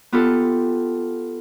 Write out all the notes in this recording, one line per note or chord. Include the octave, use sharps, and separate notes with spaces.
B3 F4 G4 A4